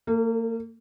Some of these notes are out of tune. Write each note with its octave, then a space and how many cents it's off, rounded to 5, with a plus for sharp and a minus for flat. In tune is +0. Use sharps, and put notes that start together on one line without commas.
A#3 -35 A4 +20